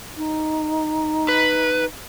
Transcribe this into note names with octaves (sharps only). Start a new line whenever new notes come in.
D#4
B4